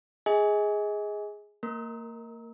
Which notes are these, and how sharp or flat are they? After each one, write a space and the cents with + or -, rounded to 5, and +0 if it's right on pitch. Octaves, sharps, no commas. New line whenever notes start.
G#4 +0 D#5 +35 G#5 +0
A#3 -30 A#4 +0